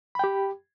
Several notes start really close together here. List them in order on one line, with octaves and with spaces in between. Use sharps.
B5 G5 G4